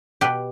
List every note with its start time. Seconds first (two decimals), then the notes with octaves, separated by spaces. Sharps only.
0.21 B2 G4 B4